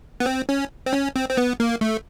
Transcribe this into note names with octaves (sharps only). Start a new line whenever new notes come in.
B3
C4
C#4
C4
C#4
C4
C4
B3
A#3
A3